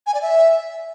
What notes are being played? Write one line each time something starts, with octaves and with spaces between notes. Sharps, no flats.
G#5
D5
E5